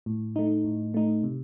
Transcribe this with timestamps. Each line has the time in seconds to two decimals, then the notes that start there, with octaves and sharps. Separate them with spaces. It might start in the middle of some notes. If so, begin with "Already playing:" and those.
0.06 A2
0.36 A3 D#4
0.65 A2
0.94 A3 D#4
1.24 C3